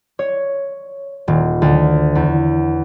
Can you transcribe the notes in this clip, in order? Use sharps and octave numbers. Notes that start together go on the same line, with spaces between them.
C#5
D#1
D2
E2